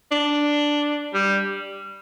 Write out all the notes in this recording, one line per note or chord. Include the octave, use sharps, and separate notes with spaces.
D4
G3